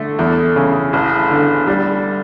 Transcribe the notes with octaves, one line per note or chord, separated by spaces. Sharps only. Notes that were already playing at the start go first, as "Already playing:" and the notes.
Already playing: D3 A3
E2
C#3
A1
D3
G3